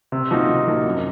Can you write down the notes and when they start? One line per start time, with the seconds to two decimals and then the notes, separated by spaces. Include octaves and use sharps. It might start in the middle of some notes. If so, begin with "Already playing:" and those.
0.12 C3
0.31 F3 A#3 D#4 F#4
0.48 C3
0.67 F3 A#3 D#4 F#4
0.86 F#2